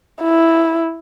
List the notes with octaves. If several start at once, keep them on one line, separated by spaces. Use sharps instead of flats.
E4